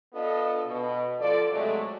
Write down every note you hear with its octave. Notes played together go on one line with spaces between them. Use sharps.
B3 D4 F4 A4 D#5
B2
D3 F3 F4 A4 D5
C3 F#3 G#3 A3